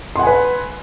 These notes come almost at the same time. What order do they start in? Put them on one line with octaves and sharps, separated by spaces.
C6 F#5 G#5 B4